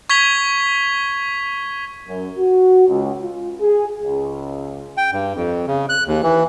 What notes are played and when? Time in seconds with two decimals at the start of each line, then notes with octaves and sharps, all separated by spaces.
0.10 C#6 G#6 B6 F7 G7
2.08 F#2
2.38 F#4
2.89 C#2
3.23 F4
3.61 G#4
4.03 C#2
4.97 G5
5.13 G2
5.35 F2
5.67 C#3
5.89 F#6
6.07 D#2
6.23 E3